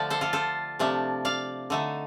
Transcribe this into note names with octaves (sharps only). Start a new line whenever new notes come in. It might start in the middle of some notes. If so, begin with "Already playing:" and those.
Already playing: D3 F3 A3 D4 D5
A4 C5
F4 A4
A4 C5
C3 F3 A3 D4
D5 F5
D3 A3 D#4